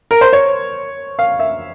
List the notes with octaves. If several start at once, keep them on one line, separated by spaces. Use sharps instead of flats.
A#4
C5
C#5
F5
E5